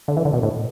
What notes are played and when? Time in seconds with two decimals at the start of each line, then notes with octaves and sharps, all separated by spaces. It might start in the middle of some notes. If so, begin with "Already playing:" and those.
0.08 D3
0.17 E3
0.25 D3
0.33 B2
0.43 A2